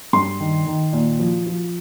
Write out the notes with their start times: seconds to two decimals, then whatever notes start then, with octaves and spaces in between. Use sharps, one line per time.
0.13 G2 C6
0.40 D#3
0.66 D#3
0.93 A#2
1.19 F3
1.46 F3